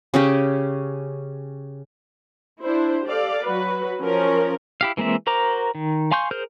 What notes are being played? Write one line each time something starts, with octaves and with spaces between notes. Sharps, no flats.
C#3 C#4 G4
D4 E4 C5
G4 A4 D5 F5
F#3 F#4 B4
F3 C#4 A#4
E4 G4 F5
E3 G#3 A#3 C4 E5
F#4 A#4 C5 A#5 D6
D#3
F5 G#5 C6 C#6 G6
G#4 A#4 C5 F6 G6